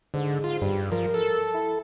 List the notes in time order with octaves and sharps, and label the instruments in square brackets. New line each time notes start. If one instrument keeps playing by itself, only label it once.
[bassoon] G#2 [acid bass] D3
[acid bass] F4
[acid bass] G2 [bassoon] G3
[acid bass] F3 [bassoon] A#4
[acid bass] A4
[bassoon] E4